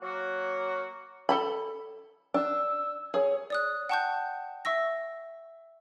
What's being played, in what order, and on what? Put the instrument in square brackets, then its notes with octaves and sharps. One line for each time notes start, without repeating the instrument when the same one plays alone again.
[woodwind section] F#3 A#3 F#4
[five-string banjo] A4 A5 B5
[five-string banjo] D4 [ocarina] E6
[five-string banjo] G#4 [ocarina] C#5
[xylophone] D5 D#6 F#6
F#5 G5 A5 C#6 F#6 G6
E5 C#6 E6 A#6